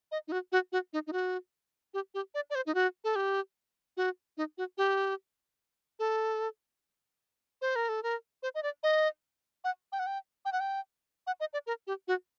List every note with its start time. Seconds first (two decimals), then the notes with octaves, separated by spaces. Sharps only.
0.12 D#5
0.28 D#4
0.32 F#4
0.52 F#4
0.72 F#4
0.93 D#4
1.07 D#4
1.13 F#4
1.94 G4
2.14 G4
2.34 D5
2.50 D5
2.55 C5
2.66 D#4
2.75 F#4
3.04 A4
3.16 G4
3.97 F#4
4.37 D#4
4.58 F#4
4.78 G4
5.99 A4
7.62 C5
7.76 A#4
7.89 A4
8.03 A#4
8.43 C5
8.55 D#5
8.63 D5
8.83 D#5
9.64 F#5
9.92 G5
9.99 F#5
10.07 G5
10.45 G5
10.53 F#5
10.60 G5
11.27 F#5
11.40 D#5
11.53 D5
11.67 A#4
11.87 G4
12.08 F#4